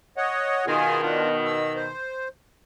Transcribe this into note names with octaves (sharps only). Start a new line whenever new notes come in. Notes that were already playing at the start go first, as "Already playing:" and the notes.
C#5 D#5 F#5
B2 D#3 F4 G#4 G#5
D4 F4
E6
C5